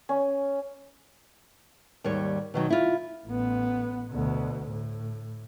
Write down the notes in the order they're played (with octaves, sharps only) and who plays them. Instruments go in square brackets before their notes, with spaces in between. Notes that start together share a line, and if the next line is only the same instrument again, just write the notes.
[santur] C#4
[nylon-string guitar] D#2 G#2 G3 C#5
B2 D#3 F#3
E4 F4
[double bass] A1 B3
D2 B2
A2